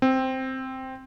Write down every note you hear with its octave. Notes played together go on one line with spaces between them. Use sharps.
C4